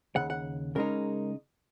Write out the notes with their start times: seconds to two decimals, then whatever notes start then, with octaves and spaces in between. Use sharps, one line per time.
0.15 D#2 C#3 F#5
0.30 F#5
0.75 C#3 G#3 D#4 A#4